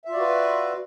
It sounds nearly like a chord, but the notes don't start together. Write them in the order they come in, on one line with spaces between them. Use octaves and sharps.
E5 F4 D5 F#4 B4